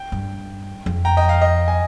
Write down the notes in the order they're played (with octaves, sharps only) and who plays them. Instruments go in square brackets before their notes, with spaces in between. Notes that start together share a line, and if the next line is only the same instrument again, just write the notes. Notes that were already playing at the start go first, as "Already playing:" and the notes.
Already playing: [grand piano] G5
[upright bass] G2
F2
[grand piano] G5 A#5
D#5 G5
F5
D#5
G#5